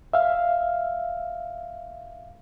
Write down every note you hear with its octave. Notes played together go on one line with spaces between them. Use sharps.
E5 F5